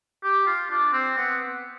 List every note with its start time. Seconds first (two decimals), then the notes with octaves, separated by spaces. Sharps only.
0.24 G4
0.46 F4
0.70 D4
0.93 C4
1.18 B3